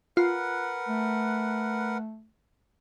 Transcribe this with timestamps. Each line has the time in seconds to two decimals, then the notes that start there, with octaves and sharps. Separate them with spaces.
0.17 F4 A#4 B4 F#5
0.89 A3